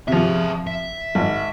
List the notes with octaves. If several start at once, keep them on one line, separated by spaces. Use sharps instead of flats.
C3 F3 G#4 E5
E5
G#1